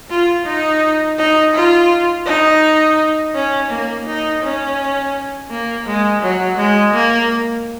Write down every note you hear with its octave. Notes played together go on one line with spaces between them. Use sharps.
F4
D#4
D#4
F4
D#4
C#4
A#3
D#4
C#4
A#3
G#3
F#3
G#3
A#3